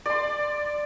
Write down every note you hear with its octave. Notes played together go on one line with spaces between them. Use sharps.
D5 C6